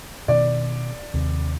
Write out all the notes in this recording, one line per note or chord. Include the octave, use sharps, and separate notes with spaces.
B2 D#3 D5
D#2 C3